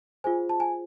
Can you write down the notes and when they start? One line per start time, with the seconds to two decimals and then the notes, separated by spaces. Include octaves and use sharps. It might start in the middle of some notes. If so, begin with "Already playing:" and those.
0.24 F4 G#4 C5 G#5
0.49 A5
0.60 G#5